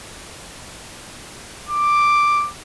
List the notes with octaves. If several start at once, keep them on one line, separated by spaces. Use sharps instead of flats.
D6